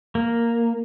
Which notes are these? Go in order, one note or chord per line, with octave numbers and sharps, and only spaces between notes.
A#3